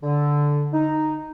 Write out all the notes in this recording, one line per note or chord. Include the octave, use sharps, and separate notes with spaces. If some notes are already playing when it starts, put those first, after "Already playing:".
D3
D#4